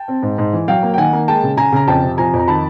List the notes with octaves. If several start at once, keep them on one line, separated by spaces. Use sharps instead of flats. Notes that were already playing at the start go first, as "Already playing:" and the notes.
Already playing: G5 A5
C4
G#2
G#2
E3
F#3 F5 G5
A#3
G5
D#3 F#5 G#5
A#3
G#3 G5 A5
C#3
C#3 G#5 A#5
C#3 A#5
F2 G5 A5
C3
F3 G#5 A#5
F2
A#5
D#3 A5 B5